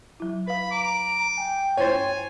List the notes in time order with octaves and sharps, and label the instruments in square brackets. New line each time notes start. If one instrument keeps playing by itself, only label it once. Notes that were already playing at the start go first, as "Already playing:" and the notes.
[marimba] F#3 E4
[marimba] B4 F5 [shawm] B5
[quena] A#5 [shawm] D6
[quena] G5 [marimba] G#5
[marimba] G2 E4 A6 [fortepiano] C5 C#5 [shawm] G#5